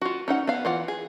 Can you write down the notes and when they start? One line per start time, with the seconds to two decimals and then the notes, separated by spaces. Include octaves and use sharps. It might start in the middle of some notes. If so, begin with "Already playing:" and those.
0.02 F4 F#4
0.28 C#4 D#4 F#5
0.47 B3 F5
0.65 E3 F4 F#5
0.88 G#4